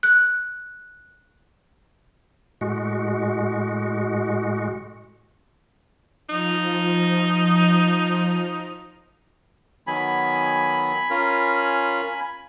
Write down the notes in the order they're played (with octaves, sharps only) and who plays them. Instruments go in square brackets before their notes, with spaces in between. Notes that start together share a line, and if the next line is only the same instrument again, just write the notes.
[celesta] F#6
[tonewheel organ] A2 G#3 F#4
[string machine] F3 [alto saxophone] D#4
[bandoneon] D#3 F#3 B3 [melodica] G#5 B5
[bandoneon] C#4 F4 A#4